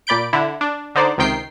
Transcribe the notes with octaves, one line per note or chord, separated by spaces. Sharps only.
A#2 D5 B5 G6 D7
D3 E4
D4
D3 D#4 C5 D5
C#2 C3 D#3 G5 C7